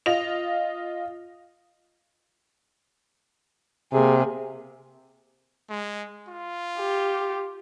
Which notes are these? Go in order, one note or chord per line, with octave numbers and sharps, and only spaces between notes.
F4 D#5 F7
C3 A#3 G#4
G#3
F4
G4